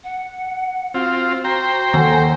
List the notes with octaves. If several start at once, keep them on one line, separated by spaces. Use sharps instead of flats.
F#5
C4 F4 F#4
F#4 C5 G5 A#5
D#2 A4 F#5 G#5